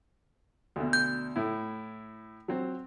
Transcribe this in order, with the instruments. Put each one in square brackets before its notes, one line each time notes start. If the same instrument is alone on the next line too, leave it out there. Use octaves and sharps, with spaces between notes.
[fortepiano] D2 B2
[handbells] G6
[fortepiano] A2 E4
F#3 C4